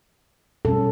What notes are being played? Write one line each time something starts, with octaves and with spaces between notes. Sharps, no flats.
B2 G3 C#4 A4